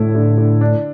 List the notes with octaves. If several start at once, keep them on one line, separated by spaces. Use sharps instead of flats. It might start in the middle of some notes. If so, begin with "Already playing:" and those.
Already playing: A2 D3 A3 E4
D3
D3
D4